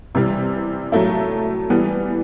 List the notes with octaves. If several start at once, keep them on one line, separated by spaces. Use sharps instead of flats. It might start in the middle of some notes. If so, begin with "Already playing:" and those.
C3 E3 G3
A2 F#3 A3 E4
E3 G3 B3